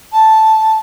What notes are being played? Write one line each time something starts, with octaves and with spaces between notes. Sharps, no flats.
A5